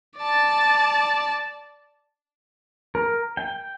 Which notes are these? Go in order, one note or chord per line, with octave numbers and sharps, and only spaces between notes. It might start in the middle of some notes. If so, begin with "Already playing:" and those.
D5 A5
A#4
G5